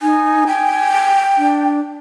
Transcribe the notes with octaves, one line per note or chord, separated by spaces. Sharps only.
D#4 G#5
G5
D4